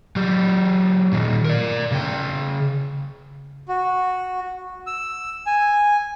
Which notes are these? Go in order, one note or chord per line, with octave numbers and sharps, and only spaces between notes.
F#3 G4
A#2 D#3
A#4 D5
C#3 G5
F#4
E6
G#5